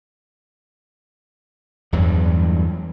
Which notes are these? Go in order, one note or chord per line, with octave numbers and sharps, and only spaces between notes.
E2 G2 F#3 G3